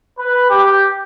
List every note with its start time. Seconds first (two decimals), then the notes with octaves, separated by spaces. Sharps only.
0.18 B4
0.50 G4